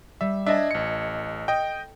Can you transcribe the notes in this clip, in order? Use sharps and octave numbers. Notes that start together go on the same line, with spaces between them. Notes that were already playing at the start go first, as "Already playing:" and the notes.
G3 E5
D4 A4 D#5 E5 G#5
A1 C#7
D#5 G5